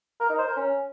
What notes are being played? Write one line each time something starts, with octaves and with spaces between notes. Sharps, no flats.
A#4
D#4
C5
A#4
C#4